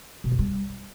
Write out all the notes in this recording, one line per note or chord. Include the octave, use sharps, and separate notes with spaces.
B2
F#2
G3